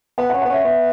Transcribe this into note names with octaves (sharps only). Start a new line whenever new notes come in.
B3 F#5
F#5
C#4
B3 F#5
C#4 E5
B3 E5